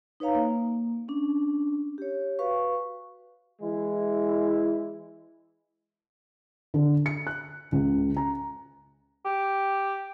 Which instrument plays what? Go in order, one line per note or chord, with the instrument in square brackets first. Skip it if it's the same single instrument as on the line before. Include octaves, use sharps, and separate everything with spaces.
[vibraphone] D#4 B4 C#5 F5 A#5
A#3
C#4 D4
G4 C#5
F#4 B4 F5 C#6
[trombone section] E3 G#3 E4
[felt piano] D3
C#7
F#6
C#2
A#5
[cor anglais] G4